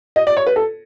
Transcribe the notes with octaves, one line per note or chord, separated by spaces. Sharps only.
D#5
D5
C#5
B4
A4